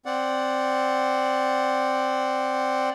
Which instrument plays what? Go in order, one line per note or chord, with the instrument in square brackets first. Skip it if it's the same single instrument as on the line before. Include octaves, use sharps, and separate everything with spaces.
[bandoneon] C4 D5 F#5